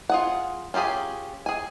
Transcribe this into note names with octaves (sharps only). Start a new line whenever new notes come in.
F4 G#4 F#5
C#4 F4 G4 G#4 G#5
G#4 G#5